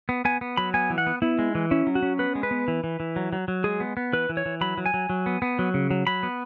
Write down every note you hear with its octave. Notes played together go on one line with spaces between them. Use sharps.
B3
B3 G#5
B3
F#3 B5
B3 G#5
E3
F#5
B3
B3 E4
G#3
E3
C#4 E4
F#3
F#4
C#4
B3 B4
G#3
B4
B3
E3
E3
E3
F#3
F#3
F#3
G#3 G#4
B3
B3
E3 B4
E3
C#5
E3
F#3 B5
F#3
G#5
F#3
F#3
B3
B3
F#3
C#3
F#3
F#3 B5
B3